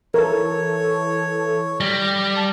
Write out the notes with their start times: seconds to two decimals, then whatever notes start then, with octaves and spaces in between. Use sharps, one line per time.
0.14 E3 A4 A#4 C#5
1.80 G3 A#6
2.36 A5